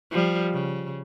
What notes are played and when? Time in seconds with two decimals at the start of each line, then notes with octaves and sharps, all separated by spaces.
0.11 F3 G3
0.53 C#3